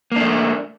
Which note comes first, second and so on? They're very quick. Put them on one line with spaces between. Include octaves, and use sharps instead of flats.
A#3 D4 A3